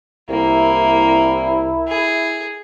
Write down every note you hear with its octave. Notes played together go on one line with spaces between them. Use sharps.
C2 A#3 E4
G#4